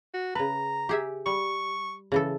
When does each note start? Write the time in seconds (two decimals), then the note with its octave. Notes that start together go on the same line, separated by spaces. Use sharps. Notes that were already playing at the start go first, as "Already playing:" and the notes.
0.14 F#4
0.35 C#3 B4 A#5
0.89 G4 G#4 E5
1.26 G3 C#6
2.12 C#3 E3 A4